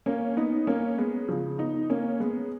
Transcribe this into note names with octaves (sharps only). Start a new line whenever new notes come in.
A#3 C#4
B3 D#4
A#3 C#4
G#3 B3
C#3 F3
B3 D#4
A#3 C#4
G#3 B3